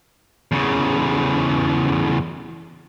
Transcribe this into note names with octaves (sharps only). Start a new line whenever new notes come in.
E2 C#3